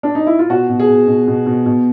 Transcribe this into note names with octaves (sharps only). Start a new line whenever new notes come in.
D4
D#4
E4
F4
B2 F#4
B2
G#4
B2
B2
B2
B2
B2